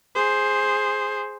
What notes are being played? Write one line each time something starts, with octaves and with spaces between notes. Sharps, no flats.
G#4 C5